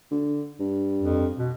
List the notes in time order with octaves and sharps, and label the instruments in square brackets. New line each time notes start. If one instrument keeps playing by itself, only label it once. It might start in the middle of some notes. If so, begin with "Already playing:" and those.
[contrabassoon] D3
G2
[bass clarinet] F2
B2